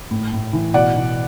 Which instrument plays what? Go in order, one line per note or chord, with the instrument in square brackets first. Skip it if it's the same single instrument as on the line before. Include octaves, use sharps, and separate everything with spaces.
[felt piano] A2
A2
E3
B2 D5 F#5
B2